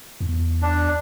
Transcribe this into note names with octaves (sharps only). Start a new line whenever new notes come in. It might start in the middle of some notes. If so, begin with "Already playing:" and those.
E2
D4